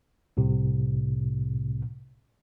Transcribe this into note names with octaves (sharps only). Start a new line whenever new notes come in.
C2 A2 C3